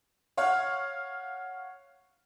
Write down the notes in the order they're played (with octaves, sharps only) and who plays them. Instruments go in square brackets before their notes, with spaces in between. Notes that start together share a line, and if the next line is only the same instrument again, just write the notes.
[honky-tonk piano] C#5 F5 F#5